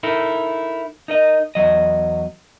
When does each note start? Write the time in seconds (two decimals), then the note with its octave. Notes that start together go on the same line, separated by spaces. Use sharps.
0.03 D#4 E4 A4 A#4
1.08 D#4 A#4 D#5
1.55 E2 F#3 D#5